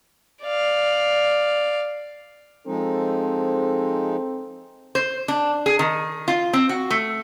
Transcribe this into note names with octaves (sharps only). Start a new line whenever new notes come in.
D5 F5
F3 G#3 C4 D#4 A4
C5
D4
G#4
D#3
F4
C4
F#4
A3